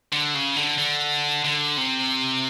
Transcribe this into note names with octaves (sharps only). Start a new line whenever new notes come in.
D3
C#3
D3
D3
D3
C3